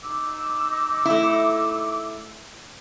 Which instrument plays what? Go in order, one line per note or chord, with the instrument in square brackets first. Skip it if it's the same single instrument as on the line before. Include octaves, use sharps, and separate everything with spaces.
[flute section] D#4 D6 E6
[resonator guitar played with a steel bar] A3 E4